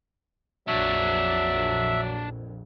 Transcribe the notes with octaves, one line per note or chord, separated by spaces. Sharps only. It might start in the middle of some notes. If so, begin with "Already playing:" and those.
A#1 F2 F#3 D4 C#5 E5